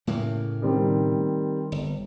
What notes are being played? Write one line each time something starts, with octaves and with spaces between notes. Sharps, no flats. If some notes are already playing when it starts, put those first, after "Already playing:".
A2 C#3 A#3
D#3 G3 C4
G1